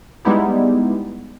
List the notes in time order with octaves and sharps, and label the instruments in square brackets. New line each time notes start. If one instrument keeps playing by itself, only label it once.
[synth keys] G3 G#3 B3 D#4 E4 G4